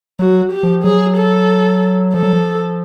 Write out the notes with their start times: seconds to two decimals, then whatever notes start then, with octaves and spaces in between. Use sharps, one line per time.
0.19 F#3 F#4
0.52 G4
0.63 F3
0.84 F#3 G#4
1.17 A4
2.14 F3 A4
2.23 F#3
2.33 F3